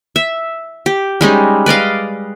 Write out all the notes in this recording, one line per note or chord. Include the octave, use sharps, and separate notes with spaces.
E5
G4
G3 G#3 C#4 D#4
B4 D5 D#5 F5